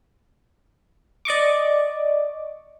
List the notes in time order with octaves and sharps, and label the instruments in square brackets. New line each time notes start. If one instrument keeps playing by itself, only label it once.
[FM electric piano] D5 D#5 C#6 D6